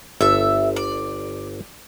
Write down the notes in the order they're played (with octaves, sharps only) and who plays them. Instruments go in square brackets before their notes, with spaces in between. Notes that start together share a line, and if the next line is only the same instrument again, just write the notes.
[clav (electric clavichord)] G1 A4 [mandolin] E5 E6
[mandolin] D5